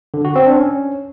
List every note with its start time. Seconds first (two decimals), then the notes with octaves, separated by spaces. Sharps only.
0.14 D3
0.25 F#4
0.36 C4
0.46 D4
0.57 C#4